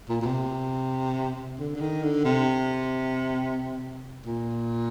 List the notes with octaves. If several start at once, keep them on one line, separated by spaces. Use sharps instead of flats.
A#2
A#2
C3
D3
D3
D#3
D3
C3
A#2